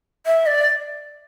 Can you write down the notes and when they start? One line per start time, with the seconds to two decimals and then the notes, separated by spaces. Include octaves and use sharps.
0.26 E5
0.47 D5